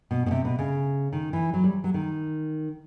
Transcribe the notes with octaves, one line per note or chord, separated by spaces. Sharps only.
B2
B2
C3
B2
C#3
D#3
E3
F#3
G3
F#3
D#3